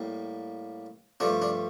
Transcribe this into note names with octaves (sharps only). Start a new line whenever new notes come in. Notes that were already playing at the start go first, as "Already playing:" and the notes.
Already playing: A2 G3 A#3
G2 F3 A3 D4
D4